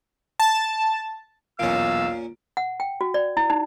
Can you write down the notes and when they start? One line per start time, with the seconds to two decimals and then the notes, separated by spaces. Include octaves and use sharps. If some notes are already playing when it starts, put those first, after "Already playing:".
0.40 A5
1.59 B1 E2 A#2 C#4 F5 E6 D7
2.57 F#5
2.80 G5
3.01 F#4
3.14 D5
3.37 E4
3.50 D#4